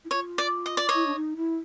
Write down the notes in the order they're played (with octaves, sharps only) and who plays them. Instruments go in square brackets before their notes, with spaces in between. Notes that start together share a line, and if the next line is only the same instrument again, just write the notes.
[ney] E4
[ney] F4 [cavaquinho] C#5
[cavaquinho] D5
D#5
D5
[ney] E4 [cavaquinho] C#5 D#5
[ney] D4
D#4
E4